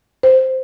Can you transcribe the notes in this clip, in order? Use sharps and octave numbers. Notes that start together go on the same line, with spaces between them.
C5